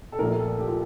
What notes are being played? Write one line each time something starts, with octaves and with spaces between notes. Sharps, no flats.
A4
A#1 A#2 A3 A#4
A#4
A4
G4
F4